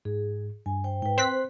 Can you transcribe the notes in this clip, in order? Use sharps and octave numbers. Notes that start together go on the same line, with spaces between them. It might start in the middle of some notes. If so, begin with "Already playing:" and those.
G#2 G#4
G2 G#5
C5 G5
G#2 B4 G5
C4 C6 F#6 B6